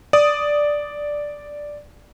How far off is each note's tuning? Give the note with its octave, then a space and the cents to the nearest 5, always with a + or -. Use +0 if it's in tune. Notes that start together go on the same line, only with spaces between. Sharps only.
D5 +0 D#6 +0